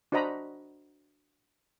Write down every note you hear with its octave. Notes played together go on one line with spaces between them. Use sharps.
D4 F#4 C5 D#5 A#5 B5